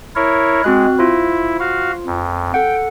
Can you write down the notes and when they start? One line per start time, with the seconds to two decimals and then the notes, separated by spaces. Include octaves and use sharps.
0.16 E4 A#4 C#5
0.64 G#3 C4 F#4 F#6
0.99 E4 F4 C5
1.60 F#4 F5
2.07 F2
2.54 A4 F#5 G5